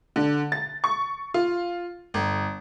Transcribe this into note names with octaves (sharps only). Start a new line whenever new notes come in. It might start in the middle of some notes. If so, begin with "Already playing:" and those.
D3
A6
C#6
F4
G1